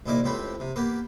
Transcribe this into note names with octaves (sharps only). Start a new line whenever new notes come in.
C2 A#2 D#4 E4 A#4 D6
C#2 A2 C4 G4 B5
C3
A#3 B3 G4 A#4